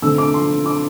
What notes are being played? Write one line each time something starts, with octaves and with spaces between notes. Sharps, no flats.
D3 A3 C4 E6
D6
C6
D6